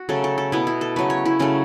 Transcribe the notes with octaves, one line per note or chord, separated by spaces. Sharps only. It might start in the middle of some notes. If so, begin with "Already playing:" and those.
Already playing: F#4
C#3 F#3 A3 A4
A4
A4
B2 B3 E4
E4
A4
C#3 F#3 A3 B4
C#5
E4
C#3 F#3 A3 C#4